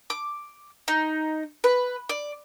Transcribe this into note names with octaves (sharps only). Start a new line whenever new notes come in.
D6
D#4
B4
D5